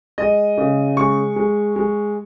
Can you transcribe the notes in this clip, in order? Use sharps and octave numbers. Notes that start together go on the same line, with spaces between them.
G#3 D#5
C#3
G#3 C#6
G#3
G#3